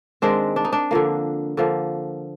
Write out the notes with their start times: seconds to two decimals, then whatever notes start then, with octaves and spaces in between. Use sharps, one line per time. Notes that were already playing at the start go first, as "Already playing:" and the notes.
0.22 D#3 G#3 C4 D4
0.56 D4
0.65 D#4
0.73 D4
0.91 D3 F3 A#3
1.57 D3 F3 A#3